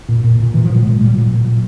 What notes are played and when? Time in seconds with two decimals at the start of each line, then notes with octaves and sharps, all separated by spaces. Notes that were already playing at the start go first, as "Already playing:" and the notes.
0.09 A#2
0.24 A#2
0.39 A#2
0.54 A#2 E3
0.65 F3
0.70 A#2
0.75 F#3
0.84 A#2 G#3
0.95 F#3
1.01 A#2 G3
1.15 A#2 F#3
1.31 A#2
1.45 A#2